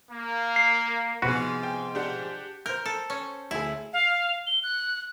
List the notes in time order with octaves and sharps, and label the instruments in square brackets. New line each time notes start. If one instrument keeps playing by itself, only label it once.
[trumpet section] A#3
[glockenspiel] C7
[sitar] G#2 F3 G#4 [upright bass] C3 B3 [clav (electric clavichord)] F#4 B4
[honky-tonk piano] G5
D4 G4 F#5
[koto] A#4 [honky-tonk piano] C5 G6
[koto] A4
C#4
[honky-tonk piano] D2 G#4 [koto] E4
[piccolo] F5
G7
F#6